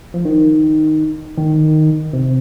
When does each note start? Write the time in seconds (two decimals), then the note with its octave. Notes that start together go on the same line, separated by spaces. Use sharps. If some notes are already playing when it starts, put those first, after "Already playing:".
0.14 F3
0.25 D#3
1.37 D#3
2.13 C3